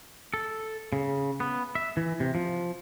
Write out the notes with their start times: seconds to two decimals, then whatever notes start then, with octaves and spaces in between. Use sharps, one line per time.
0.34 A4
0.93 C#3
1.40 B3
1.75 E5
1.97 E3
2.20 C3
2.35 F3